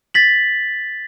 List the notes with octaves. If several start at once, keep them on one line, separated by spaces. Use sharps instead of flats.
A6 B6 F#7